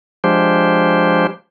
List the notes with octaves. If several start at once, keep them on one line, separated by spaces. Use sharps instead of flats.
F3 G#3 D4 G4 C5